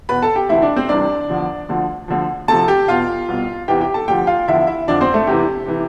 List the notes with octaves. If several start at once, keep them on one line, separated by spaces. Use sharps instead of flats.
E2 B2 B4 B5
A4 A5
G4 G5
D2 C3 E3 E4 E5
D4 D5
C4 C5
C2 C3 E3 D4 D5
E2 D3 F3
D2 D3 F3
D2 D3 F3
D2 C3 F3 A4 A5
G4 G5
E2 B2 F4 F5
C2 B2
E2 C3 E3 G4 G5
G4 G5
A4 A5
D2 D3 F3 G4 G5
F4 F5
E2 D3 F3 E4 E5
E4 E5
F2 D3 F3 D4 D5
C4 C5
A3 A4
E2 C3 E3 G4
C3 E3